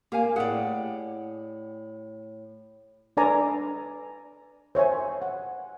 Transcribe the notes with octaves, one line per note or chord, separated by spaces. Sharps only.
A#3 G4 F5 G#5
A2 G4 G#4 D5 F#5
D4 A4 B4 D5 G#5 A#5
C5 C#5 E5 G#5
F#5